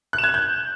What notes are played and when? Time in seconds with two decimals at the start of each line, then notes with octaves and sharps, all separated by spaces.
0.13 F#6
0.18 E7
0.24 G#6
0.29 F#6
0.34 G6